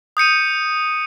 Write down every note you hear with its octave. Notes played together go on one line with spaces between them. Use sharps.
D#6 G6 C#7 D#7